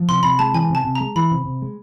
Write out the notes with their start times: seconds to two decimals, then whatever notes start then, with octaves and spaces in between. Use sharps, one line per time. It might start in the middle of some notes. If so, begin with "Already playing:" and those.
Already playing: F3
0.09 C3 C6
0.23 C3 B5
0.39 G#3 A5
0.54 E3 G#5
0.70 C3 A5
0.85 C3
0.95 G#3 A#5
1.16 E3 B5
1.31 C3
1.45 C3
1.62 G#3